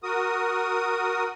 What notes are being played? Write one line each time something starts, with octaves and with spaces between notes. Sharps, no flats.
F#4 A#4 D#6